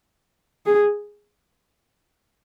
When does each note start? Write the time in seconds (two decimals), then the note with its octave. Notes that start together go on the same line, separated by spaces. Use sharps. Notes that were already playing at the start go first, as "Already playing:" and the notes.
0.66 G#4